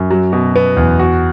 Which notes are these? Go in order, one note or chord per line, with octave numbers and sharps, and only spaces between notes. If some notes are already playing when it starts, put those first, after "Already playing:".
Already playing: F#2
F#3
B2
B3
E2
F#4